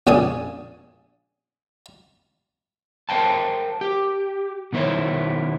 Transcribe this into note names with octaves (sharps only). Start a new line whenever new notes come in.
A#1 C#3 D5 G#5 D#6
A#4 C5 F5 G5 A5
G4
B2 D#3 G#3 E4 C5 C#5